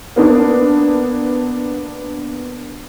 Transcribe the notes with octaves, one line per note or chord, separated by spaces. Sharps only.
A#3 B3 D4